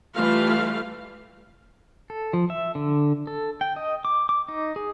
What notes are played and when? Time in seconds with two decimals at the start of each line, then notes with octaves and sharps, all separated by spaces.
0.16 E3 G3 A3 F4 F5
2.10 A4
2.33 F3
2.50 E5
2.75 D3
3.27 A4
3.61 G5
3.76 D#5
4.05 D6
4.29 D6
4.48 D#4
4.76 G#4